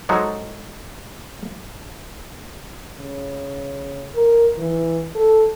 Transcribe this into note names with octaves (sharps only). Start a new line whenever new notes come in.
F3 F#3 G#3 D#4 A4
C#3
A#4
E3
A4